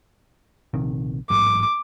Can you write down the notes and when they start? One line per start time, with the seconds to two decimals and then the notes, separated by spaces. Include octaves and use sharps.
0.74 A#1 C3 D#3
1.30 A1 G#2 F#3 D6